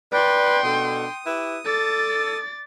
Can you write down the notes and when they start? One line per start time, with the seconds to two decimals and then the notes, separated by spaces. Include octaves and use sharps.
0.12 B4 D5 G5 C6
0.64 B2 D4 A4 D#6
1.26 E4 G4 B4
1.66 A4 D5 A6